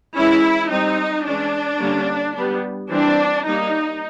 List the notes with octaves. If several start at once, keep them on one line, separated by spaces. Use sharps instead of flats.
E3 G#3 C#4 E4
G3 C4 D#4
E3 G#3 C#4 D4
D3 G3 A#3 C#4
G3 B3 D4
E3 G3 C4 D4
G3 A#3 D4 D#4